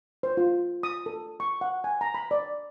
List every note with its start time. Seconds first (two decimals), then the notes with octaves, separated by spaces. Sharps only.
0.23 C5
0.37 F4
0.83 D#6
1.06 A4
1.40 C#6
1.61 F#5
1.84 G#5
2.01 A#5
2.14 B5
2.31 D5